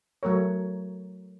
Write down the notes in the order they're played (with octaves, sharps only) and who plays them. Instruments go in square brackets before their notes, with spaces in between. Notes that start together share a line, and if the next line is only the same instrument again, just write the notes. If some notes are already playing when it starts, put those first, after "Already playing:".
[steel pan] F#3 A3 A#4 C#5